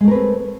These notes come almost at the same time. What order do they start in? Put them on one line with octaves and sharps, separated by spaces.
G#3 A3 A#4 B4 C4